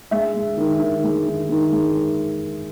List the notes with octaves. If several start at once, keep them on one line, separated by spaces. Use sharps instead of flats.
G#3 E5
G#3
D#3
D#3
G#3
D#3
D#3
G#3